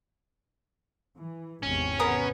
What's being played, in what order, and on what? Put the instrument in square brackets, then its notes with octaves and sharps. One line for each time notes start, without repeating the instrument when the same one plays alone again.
[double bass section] E3
[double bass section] G#1 E2 C3 [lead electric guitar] C#4
[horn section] B3 [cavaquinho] G#4 A#4 D#6